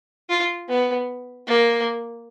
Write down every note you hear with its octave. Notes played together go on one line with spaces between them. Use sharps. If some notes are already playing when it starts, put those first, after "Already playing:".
F4
B3
A#3